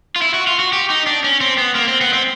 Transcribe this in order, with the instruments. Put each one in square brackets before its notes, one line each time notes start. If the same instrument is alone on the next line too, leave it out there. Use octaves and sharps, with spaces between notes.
[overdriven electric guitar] F4
E4
F#4
F4
F#4
G4
D#4
D4
C#4
C4
B3
A#3
C4
B3
C4